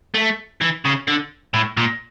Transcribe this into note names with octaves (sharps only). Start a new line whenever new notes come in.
A3
E3
C#3
D3
A2
A#2